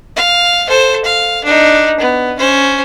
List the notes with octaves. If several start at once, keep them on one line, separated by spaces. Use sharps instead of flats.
F5
A4 C5
F5
D4 D#4
B3
C#4 C5